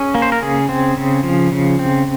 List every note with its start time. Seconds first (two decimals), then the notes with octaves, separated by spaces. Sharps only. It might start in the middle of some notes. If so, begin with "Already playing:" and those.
Already playing: C#4 G#4
0.15 A#3
0.22 C5
0.32 A#4
0.42 C#3 G#4
0.69 C4
0.97 C#3
1.23 F3
1.52 C#3
1.79 C4